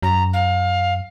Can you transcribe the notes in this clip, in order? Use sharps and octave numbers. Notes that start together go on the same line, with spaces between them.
F#2 A#5
F5